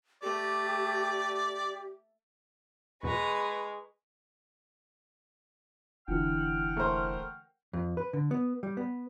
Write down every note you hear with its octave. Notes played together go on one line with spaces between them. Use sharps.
A3 G4 D5
E2 B2 F#3 G#3 B4 A#5 C#6
F1 D3 E3 F#5 G5 F6
A3 A#4 C5
F2
B4
D3
B3
G3
B3